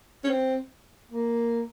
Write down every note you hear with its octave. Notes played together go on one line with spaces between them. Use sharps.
C#4
C4
A#3